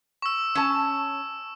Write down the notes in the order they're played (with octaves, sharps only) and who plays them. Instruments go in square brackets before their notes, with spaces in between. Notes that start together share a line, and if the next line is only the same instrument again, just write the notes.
[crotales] C#6 E6
[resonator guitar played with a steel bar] C#4 A5